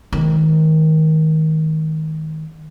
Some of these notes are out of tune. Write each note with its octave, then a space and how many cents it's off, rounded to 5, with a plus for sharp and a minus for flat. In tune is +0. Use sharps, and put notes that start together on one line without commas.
D#3 +20 G#3 +45